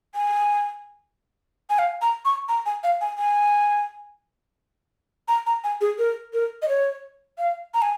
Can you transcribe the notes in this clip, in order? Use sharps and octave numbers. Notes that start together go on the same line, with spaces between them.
G#5
G#5
F5
A#5
C#6
A#5
G#5
F5
G#5
G#5
A#5
A#5
G#5
G#4
A#4
A#4
D#5
C#5
F5
A#5
G#5